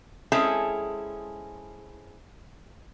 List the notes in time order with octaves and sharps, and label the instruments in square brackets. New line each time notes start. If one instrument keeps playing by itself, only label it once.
[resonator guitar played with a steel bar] G#3 C4 C#4 E4 G#4 A4